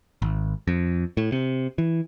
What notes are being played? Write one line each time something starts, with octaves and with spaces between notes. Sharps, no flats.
G#1
F2
A2
C3
E3